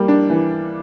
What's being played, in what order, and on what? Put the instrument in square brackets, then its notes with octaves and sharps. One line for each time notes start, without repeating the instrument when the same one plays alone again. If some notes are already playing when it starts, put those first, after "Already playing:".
Already playing: [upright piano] G3 A#3
D4
E3